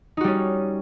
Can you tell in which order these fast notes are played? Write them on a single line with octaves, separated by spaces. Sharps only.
D#4 F#4 G3 C#4